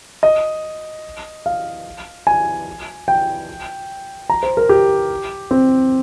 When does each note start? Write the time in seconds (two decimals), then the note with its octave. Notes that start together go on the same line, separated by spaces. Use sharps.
0.23 D#5
1.46 F5
2.27 G#5
3.08 G5
4.30 A#5
4.43 C5
4.57 A#4
4.69 G4
5.51 C4